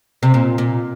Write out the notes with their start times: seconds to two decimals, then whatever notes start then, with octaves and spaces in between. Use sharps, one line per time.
0.23 C3
0.34 A#2
0.58 A#2